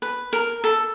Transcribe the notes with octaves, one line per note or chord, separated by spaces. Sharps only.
B4
A#4
A4